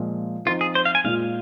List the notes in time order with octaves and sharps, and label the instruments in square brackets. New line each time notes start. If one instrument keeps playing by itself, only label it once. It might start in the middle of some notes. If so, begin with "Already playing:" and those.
Already playing: [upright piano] A#2 F3 G#3 F4
[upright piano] F3 C4 D#4 [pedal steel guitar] F4
[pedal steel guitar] G#4
C5
F5
G#5
[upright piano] A#2 G#3 F4 [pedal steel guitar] F5